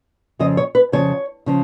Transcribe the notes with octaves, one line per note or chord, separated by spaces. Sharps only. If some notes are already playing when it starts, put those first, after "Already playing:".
F2 C#3 F3 D#5
C#5
B4
F2 C#3 F3 C#5
C#3 F3